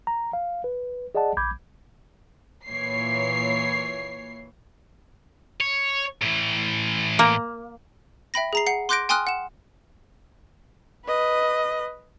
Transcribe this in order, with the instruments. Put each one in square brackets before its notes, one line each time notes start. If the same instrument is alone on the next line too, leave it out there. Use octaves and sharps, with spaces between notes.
[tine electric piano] A#5
F5
B4
G#4 D5 D#5 F#5 A5
A#1 B5 D6 G6 G#6
[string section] A#2 E3 C#5 C7
[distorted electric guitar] C#5
A2 E3
[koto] A#3
[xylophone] E5 G5 B5 A#6
G#4 A#5 C7
F#5 C7
C6 D6 F#6 G6 A#6 D7
G5 G#5 C6 D#6 F6 F#6
F#5 E7
[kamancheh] B4 D#5